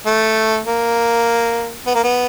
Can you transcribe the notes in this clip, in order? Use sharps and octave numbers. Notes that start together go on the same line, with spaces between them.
A3
A#3
B3
A#3
B3